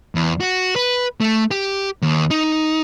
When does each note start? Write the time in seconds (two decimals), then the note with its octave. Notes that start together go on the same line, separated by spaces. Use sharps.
0.15 E2
0.40 F#4
0.76 B4
1.20 A3
1.51 G4
2.02 D#2
2.31 D#4